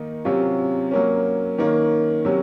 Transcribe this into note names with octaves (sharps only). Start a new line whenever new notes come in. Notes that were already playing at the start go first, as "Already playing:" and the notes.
Already playing: D#3 A#3 D#4
C3 F#3 C#4 F4
F#3 A#3 C#4
D#3 A#3 C#4
C3 F#3 C#4